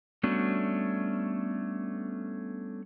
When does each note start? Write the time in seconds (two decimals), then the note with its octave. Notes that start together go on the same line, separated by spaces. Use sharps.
0.23 G3 A3 B3 C#4 D4 F#4